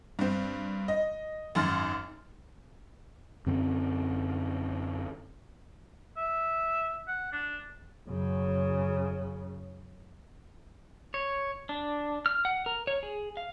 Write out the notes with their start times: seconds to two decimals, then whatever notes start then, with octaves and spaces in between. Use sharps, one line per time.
0.19 G2 C4
0.88 D#5
1.55 G#1 F#2 C6 F6 A6
3.46 F#2 D3 C4
6.17 E5
7.08 F#5
7.32 D4
8.09 F#2 C#3
11.14 C#5
11.69 D4
12.26 F6
12.45 F#5
12.66 A#4
12.87 C#5
13.03 G#4
13.37 F5